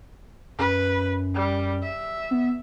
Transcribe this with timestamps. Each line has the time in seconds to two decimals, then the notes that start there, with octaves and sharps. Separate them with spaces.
0.58 F#2 B4
1.35 G3
1.82 E5
2.31 B3